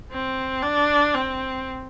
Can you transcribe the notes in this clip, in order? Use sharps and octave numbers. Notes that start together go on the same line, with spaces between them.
C4
D4
C4